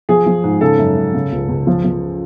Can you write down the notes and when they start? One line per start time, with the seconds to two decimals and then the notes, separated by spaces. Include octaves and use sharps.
0.09 F3 G#4
0.26 F3
0.44 G#2
0.61 C#3 A4
0.78 F#2
0.96 F#2
1.14 C#3
1.32 C#2
1.49 C#2
1.67 F3
1.84 F3